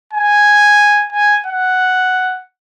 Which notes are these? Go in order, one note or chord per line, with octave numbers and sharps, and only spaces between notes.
G#5
G#5
F#5